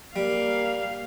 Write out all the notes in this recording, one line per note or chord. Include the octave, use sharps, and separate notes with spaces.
G3 A#3 F5